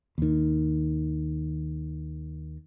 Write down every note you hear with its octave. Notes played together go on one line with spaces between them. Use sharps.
D#2 D#3